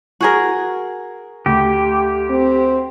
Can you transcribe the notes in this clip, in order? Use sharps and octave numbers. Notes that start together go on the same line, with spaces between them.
F#4 G#4 A#4
D2 G4
C4